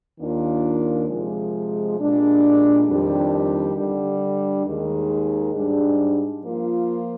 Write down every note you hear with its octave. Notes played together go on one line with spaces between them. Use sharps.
D#2 D#3 A#3 D4 F4
C3 F3 G#3
A#2 G#3 D4 G4
F2 D#3 G3 D4 G4
D3 G3 D4
D#2 D#3 G#3
G#2 G3 D4 G#4
F3 A#3 F4